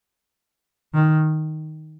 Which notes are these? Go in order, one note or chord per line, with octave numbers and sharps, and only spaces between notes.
D#3